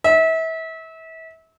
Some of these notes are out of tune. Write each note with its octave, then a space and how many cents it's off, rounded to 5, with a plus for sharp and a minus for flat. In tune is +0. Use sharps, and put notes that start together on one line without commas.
E5 -30